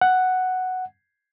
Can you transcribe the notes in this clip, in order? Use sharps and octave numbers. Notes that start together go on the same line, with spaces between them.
F#5